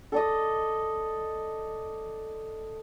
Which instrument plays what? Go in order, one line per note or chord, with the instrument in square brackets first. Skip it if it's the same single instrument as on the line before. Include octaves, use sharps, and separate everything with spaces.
[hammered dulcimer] A4 D5 D#5